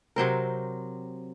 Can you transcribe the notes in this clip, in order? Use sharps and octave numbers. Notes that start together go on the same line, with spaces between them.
C3 F#3 C4 A#4